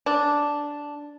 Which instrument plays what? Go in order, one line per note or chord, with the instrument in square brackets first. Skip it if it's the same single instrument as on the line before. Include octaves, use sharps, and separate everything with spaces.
[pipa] D4